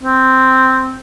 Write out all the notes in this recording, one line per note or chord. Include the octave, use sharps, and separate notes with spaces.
C4